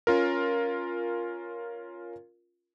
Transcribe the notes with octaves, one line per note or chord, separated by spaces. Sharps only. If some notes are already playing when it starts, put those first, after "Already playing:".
C#4 F4 A#4